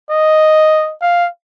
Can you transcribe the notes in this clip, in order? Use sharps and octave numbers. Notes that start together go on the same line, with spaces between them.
D#5
F5